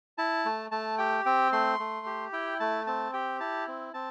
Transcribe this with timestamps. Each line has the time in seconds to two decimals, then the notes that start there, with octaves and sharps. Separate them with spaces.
0.18 E4 A5
0.45 A3
0.71 A3 A5
0.98 G4 G5
1.26 C4 G5
1.52 A3 C6
1.80 A3
2.06 G4
2.33 E4 G5
2.60 A3 A5
2.87 C4 A5
3.13 G4 G5
3.40 E4 A5
3.68 C4
3.94 C4 A5